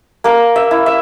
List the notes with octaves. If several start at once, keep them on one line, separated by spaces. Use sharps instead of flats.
A#3 A#4
E5
E4
E5